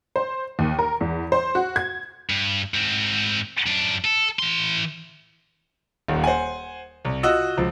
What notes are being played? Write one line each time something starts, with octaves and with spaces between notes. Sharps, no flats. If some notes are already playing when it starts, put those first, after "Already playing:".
C5
D#2
A#4
E2
C5
F#4
G#6
G2
G#2 C4
F#2 D4
A4
E3 C6
D#1 D#2
C5 F#5 G#5
C2
F4 F#4 D#5 E6
C#2 F3